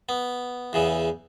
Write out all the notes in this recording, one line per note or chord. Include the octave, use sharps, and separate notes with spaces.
B3
E2 C#3 E3